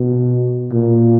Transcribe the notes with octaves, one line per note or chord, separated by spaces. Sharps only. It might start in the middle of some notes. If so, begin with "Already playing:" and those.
Already playing: B2
A#2